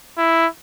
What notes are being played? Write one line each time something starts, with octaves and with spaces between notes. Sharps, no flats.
E4